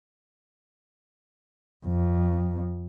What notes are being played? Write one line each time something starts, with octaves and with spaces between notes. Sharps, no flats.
F2